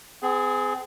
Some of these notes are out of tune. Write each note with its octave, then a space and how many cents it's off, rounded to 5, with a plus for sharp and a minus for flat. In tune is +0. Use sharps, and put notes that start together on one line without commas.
C4 -45 G#4 +0